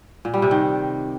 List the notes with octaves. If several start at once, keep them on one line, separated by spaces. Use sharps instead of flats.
A#2
G3
C3
D#3